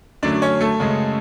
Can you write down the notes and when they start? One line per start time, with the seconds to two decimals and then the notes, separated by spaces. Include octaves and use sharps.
0.23 F#2 D3 F#3 A3 D4 D5
0.42 C#4 C#5
0.61 A3 A4
0.80 F#2 C#3 G#3